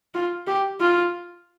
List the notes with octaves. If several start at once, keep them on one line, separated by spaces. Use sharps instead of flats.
F4
G4
F4